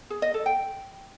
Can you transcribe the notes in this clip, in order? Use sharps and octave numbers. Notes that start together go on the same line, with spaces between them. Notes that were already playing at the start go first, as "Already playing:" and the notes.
G#4
D#5
A4
G5